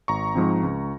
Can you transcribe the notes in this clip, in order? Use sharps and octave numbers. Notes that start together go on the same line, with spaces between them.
G#1 A#5 C#6
G#2 F3 C4
C#2